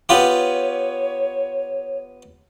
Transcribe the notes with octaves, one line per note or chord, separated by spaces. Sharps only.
B3 F4 G4 C#5